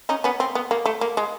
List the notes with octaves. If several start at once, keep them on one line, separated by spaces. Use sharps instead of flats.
C#4 D#4
B3 C#4
C4
B3
A#3
A3
A#3
G#3